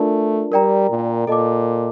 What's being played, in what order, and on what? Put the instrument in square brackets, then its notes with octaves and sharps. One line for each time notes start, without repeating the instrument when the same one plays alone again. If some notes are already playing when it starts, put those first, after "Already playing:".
Already playing: [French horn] A3 [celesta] D4 F4 A#4 D5 A5
[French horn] G3 [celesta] A#4 D5 G5 A#5
[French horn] A#2
[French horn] A#2 [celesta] A4 D#5 A5 D6